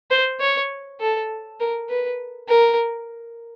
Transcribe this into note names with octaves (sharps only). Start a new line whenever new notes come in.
C5
C#5
A4
A#4
B4
A#4